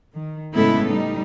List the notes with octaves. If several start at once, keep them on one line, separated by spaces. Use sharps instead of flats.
D#3
A2 C#3 G#3 B3 E4 A4
G3 D#4